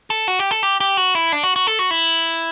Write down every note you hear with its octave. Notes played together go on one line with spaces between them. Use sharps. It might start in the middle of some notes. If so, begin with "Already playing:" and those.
A4
F#4
G4
A4
G4
G4
F#4
E4
D4
F#4
F#4
A4
F#4
E4